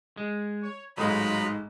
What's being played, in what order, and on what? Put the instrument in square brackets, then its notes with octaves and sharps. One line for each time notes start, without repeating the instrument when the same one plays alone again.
[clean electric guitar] G#3
[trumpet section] C#5
[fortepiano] A1 G#2 G#3 [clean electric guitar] F#3 [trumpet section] B3 F4 B5 [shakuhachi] D#4